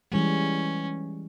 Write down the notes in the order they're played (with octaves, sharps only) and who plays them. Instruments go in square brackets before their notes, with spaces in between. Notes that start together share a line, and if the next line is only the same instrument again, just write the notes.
[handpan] E3 G3 G#3 [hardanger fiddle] C#4